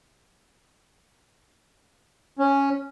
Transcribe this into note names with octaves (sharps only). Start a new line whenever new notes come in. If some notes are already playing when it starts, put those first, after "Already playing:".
C#4